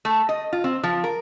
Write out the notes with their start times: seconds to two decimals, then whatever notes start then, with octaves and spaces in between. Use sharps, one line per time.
0.05 A3
0.29 D#5
0.53 F4
0.64 C4
0.83 F3
1.04 A#4